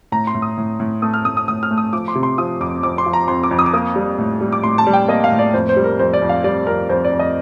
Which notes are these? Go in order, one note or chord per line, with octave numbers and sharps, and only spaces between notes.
A2 A#5
C6
A2
D#6
A2
A2
A3 D#6
F6
A2 D#6
D#6
A2 D#6
F6
A3
D#6
F3 D6
C6
C3
C6
F3 D#6
F2 D6
F2 D6
C6
F3
A#5
F2 C6
D6
F2
D#6
D6
A#3 D#6
G3
A2
G3
D6
A2 C6
A5
G3
G5
A#3 D#5
F5
A2
D5
F2 C5
C5
G3
A#4
F2 C5
D5
F2
F5
G3 D5
F2 A#4
F2 C5
D5
F2
D#5